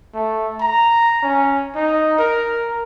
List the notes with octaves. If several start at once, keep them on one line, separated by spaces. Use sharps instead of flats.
A3
A#5
C#4
D#4
A#4